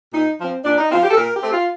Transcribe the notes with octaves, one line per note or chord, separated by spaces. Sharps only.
A#2 D#4
F3 C4
A#2 D4
D#4
F3 C4 F4
G4
A4
A#2 A#4
G4
A3 C4
F4